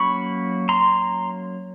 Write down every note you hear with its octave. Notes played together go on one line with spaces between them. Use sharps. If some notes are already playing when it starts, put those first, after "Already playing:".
Already playing: F#3 A#3 C#4 B5 C#6
A#5 C6